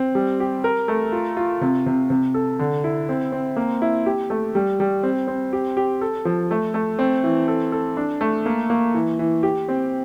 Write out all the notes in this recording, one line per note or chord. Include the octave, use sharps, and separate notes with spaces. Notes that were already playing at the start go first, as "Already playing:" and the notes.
Already playing: C4
G3
G4
A#4
A3
F4
F4
C3
C3
C3
A4
D3
E4
C4
C4
A#3
E4
G4
A3
G3
G3
C4
C4
G4
G4
A4
F3
A3
A3
C4
E3
A4
A4
D4
A3
A#3
A#3
E3
E3
G4
C4